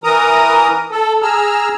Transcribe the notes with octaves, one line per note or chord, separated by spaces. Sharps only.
E3 A#4 A#5 D#6
A4
G#4 A#5 E6 F6